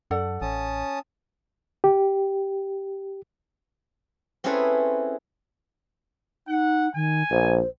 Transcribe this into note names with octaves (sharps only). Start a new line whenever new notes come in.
F#2 A4 D5 F#5
A1 C#4 A5 D#6
G4
C4 C#4 E4 G#4 A4 B4
D#4 F#5
D#3 G#5
A#1 C5